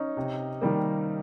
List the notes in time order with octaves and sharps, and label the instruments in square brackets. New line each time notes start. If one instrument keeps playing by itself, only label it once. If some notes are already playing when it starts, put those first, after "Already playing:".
Already playing: [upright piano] C#4 D#4
C3
D#3 G3 A#3